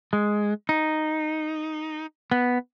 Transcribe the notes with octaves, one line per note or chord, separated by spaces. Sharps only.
G#3
D#4
B3